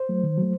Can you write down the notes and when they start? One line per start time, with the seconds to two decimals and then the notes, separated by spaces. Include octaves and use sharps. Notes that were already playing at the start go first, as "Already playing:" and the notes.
Already playing: C5
0.09 F#3 A3
0.24 D#3
0.38 F#3 A3